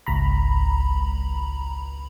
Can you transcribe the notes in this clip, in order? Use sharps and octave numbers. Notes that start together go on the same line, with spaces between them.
G#1 C#2 A#5 B5